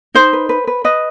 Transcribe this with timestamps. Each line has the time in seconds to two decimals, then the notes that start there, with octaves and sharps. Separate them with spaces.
0.15 D#4 C5
0.33 B4
0.49 B4
0.67 B4
0.84 B4 D#5